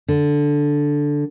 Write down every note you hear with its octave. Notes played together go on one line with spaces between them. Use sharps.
D3